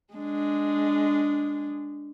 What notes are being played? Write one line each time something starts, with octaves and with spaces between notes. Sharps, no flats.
G#3 D4